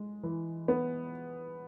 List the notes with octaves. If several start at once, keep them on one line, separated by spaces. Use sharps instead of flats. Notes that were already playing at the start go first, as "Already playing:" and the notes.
Already playing: G#3
E3
B3